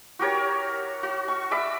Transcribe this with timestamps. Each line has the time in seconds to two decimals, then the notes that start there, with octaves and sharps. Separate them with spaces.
0.19 F#4 G4 A#4 C#5
1.03 F#4
1.28 C#6
1.51 D5 E5 B5 D6